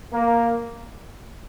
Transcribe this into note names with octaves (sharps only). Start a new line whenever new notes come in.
A#3